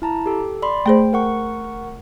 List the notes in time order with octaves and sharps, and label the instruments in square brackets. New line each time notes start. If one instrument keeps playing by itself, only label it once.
[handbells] E4 A5 A#5
G4 A4
D5 B5 C6
[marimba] A3 G#4 C5 [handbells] G5
[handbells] A#4 F#5 C#6